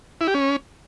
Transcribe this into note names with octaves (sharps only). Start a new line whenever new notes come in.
E4
G4
C#4